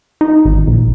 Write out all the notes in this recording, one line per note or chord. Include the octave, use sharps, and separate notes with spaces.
D#4
G#1
A#1